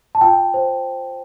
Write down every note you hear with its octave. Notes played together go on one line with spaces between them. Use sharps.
A5
F4 G5
C5